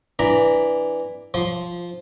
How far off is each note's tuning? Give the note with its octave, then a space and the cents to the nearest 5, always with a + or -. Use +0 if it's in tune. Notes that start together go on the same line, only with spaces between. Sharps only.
E3 +0 D4 +0 A#5 +0
F3 +0 C6 -5